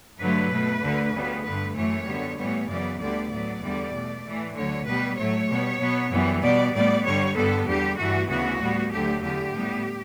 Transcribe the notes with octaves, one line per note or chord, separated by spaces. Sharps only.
G2 D3 F#3 A3 B4
B2 A3
D2 D3 A3
D2 C#3 G3 B3
G2 D3 A3 B4
F#2 E3 A3 C#5
F#2 D3 G3 B3
A2 E3 G3 B3 C#5
F#2 C#3 E3 B3 D5
D2 D3 G3 B3 D5
A2 F#3 B3 D5
E2 D3 G3 B3
B2 A3
A2 E3 A3
D2 D3 F#3 C#5
B2 G3 B3 B4
A2 F#3 A3 C#5
B2 G3 B3
B2 F#3 B3
F#2 E3 G3 B3
B2 G3 B3 D5
A2 G3 B3 D5
G2 D3 G3 C#5
G2 D3 G3 B3 A4
E2 D3 G3 G4
G2 E3 A3 F#4
D2 C#3 E3 B3 F#4
A2 G3 B3
D2 D3 F#3 A3 G4
E2 D3 A3 G4
A2 G3 B3